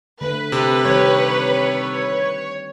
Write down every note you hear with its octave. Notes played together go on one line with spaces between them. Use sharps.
D3 A3 B4
C3
D#3 G3 C4 C#5